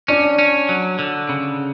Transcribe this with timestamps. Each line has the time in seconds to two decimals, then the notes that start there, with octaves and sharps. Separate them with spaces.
0.08 C#4 D4
0.39 C#4
0.69 F#3
0.99 D3
1.29 C#3